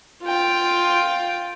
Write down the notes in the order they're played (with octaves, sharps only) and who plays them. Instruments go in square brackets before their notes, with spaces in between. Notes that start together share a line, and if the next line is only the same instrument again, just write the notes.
[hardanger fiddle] F4 G5